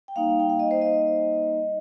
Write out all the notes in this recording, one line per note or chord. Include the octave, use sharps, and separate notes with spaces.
G5
G3 A#3 D#4 F5
G5
F5
D#5
C5
D#5